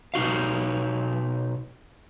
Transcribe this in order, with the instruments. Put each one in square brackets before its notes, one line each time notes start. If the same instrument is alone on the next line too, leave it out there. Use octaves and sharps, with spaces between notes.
[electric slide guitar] B2 D#4 F#4 F5